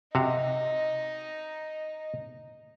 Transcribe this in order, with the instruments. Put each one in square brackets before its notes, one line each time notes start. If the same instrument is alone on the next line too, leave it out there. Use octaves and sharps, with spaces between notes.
[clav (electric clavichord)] C3 F#4 F5 [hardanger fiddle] D#4 D#5